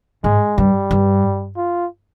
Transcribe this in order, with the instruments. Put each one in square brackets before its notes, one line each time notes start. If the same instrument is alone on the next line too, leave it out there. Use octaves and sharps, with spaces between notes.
[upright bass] G#2 [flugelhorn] G#3
[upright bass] G2 [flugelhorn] G3
[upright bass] G2
[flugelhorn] F4